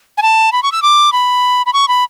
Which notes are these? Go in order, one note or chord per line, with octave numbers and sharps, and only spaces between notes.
G#5
A5
B5
C#6
E6
D6
B5
B5
C#6
B5